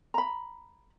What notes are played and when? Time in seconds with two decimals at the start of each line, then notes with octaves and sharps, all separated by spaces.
0.14 A#5 B5